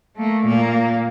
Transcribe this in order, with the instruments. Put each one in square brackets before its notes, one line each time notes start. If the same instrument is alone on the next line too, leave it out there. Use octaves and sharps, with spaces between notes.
[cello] A3 A#3
A#2 A#3